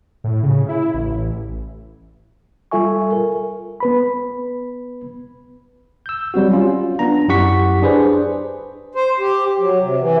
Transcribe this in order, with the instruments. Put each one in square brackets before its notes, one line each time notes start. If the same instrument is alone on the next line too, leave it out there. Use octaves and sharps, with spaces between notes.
[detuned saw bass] A2
C#3
E4
A1
[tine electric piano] G3 F4 A4 E5 G#5 C#6
A#4
[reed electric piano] B3 B4 B5
[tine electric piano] E6 G6
F#3 G3 C4 F#4
C#4 F4
B3 D4 A#5
F#2 E4 G4 F#5 C#6 B6
D4 G#4 B4 C5 D5
[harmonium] C5
G4
F#3
C3
E3